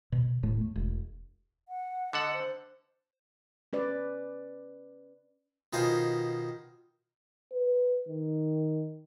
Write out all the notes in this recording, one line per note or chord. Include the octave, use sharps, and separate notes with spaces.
B2
D#1 A2 A3
A3
E1
F#5
D3 A4 D#5 F#5
C5
C#4 B4 D5
B2 D#3 F4 C5 G#5
B4
D#3